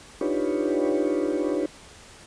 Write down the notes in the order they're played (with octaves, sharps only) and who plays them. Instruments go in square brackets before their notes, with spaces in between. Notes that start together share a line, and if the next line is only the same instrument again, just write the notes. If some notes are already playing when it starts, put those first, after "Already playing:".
[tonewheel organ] D4 D#4 F4 G4 B4 C#5